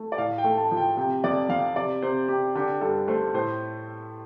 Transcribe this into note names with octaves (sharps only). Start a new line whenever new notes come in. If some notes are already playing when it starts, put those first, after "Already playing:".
Already playing: A3
D5
A2 F5
G5
A3
A5
F3
G5
C3 G5
F2 D5
F2 F5
C3 D5
C3 C5
C3 G4
D3 G4
G2 A4
A3 C5
A2 C5